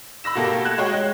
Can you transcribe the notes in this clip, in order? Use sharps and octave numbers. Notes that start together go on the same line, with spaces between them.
B5 E6 A#6 E7
B2 A3 A#3 G4 A4
F#6 G#6 E7
G#3 F#4 C#5 D#5 G5
G#3